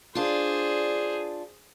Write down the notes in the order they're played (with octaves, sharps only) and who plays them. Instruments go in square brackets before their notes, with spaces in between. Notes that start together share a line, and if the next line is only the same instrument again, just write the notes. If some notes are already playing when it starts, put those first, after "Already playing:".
[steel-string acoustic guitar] D4 F4 [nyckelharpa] G#4 C5